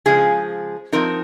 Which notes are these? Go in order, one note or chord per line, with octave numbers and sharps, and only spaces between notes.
C#3 F3 G#3 G#4
F3 C4 D#4 A#4